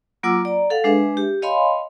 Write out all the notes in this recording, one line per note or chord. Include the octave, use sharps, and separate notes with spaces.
F#3 A#3 F4 F#5 D6 E6
D5 A#5
A4 F5 F#5
G#3 D4 G#4 B4 E5
G4
C#5 D#5 F5 G#5 B5 C6